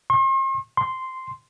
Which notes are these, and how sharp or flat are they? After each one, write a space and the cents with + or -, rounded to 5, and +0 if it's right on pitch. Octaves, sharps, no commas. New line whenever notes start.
C6 +45
C6 -5